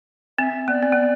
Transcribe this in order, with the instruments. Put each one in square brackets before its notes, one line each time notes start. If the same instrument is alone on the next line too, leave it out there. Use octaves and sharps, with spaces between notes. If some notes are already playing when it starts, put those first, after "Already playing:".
[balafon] C4 [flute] E5
[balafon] B3 [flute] D5
[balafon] C4
B3